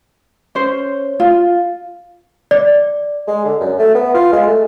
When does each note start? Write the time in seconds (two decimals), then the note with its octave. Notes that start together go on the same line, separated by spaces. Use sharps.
0.55 C#4 C5 C#5
1.20 F4
2.51 D5
3.27 G#3
3.45 D3
3.60 F#2
3.78 A3
3.95 B3
4.14 F4
4.32 G#3
4.46 A3